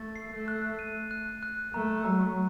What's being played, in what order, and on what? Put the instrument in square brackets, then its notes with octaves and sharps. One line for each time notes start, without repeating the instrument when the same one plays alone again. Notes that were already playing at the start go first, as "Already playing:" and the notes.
Already playing: [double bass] A3 [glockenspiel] A6
[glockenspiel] C7
[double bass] A3
[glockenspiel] F#6
D#7
F#6
F#6
[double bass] A3 [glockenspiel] A#5
[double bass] F#3 [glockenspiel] A#5